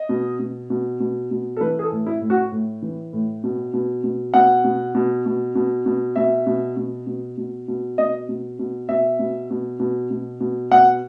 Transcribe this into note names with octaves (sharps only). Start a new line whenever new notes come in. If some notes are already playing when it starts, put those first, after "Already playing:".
Already playing: D#5
B2
B2
B2
B2
B2
A4
E3 B4
G#4
A4
A2
E4
A2
F#4
A2
E3
A2
B2
B2
B2
B2 F#5
B2
B2
B2
B2
B2
B2 E5
B2
B2
B2
B2
B2
B2 D#5
B2
B2
B2 E5
B2
B2
B2
B2
B2
B2 F#5